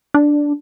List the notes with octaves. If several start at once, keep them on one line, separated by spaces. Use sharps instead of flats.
D4